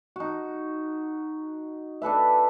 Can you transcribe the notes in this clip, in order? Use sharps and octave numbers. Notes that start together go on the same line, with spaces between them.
D#4 F#4
D4 A4 B4 E5